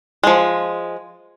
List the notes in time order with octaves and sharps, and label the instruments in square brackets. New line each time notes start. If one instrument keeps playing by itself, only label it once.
[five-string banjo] F3 G#3